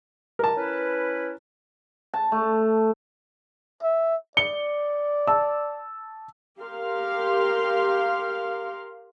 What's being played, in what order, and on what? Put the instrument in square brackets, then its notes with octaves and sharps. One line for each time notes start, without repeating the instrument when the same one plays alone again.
[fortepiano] A#4 A5
[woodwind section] C#4 E4 B4
[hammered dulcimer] A5
A3
[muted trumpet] E5
[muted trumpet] D5 [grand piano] C#7 G7
[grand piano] A5 E6
[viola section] G4 A#4 F5 C6